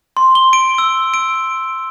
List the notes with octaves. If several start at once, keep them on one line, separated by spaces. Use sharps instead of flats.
C6
G7
D7
E6
D7